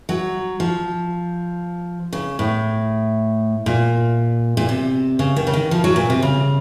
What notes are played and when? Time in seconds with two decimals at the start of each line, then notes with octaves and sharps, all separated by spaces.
0.09 F#3
0.60 F3
2.13 C#3
2.39 A2
3.66 A#2
4.57 A#2
4.69 C3
5.19 C#3
5.36 D#3
5.47 C#3
5.54 D#3
5.71 F3
5.84 F#3
5.96 A#2
6.10 C3
6.22 C#3